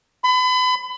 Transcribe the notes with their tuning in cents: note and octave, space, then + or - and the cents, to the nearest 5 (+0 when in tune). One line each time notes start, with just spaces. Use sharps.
B5 +35